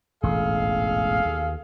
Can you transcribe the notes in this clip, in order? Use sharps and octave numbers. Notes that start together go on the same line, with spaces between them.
E1 A1 G#2 G#4 A4 F5
D#2